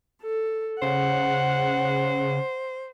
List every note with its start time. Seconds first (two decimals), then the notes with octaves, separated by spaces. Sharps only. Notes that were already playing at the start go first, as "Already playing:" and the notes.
0.23 A4
0.82 C#3 C5 F#5